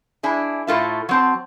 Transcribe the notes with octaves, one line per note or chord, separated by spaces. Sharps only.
D4 E4 G#4
A2 A3 F4 E5
F#3 C4 A5